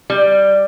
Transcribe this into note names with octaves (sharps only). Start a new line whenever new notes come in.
G3